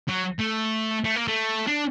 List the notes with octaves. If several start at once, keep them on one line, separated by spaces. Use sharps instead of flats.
F#3
A3
A3
A#3
A3
D4